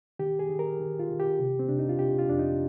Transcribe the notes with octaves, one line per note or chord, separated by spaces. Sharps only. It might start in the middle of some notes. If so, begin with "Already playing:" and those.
D#3 G4
G#4
D#3
A#4
D#3
F4
D#3
G4
C3
C4
C3 D4
D#4
F4
C3 G4
F4
F2 D4
D#4